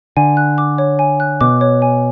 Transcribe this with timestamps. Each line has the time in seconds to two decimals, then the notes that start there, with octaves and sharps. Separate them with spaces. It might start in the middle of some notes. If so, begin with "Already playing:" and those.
0.17 D3 G#5
0.37 F#6
0.58 D6
0.78 C#5
0.99 G#5
1.20 F#6
1.41 B2 D6
1.61 C#5
1.82 G#5